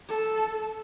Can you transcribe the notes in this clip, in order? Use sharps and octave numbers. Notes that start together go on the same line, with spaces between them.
A4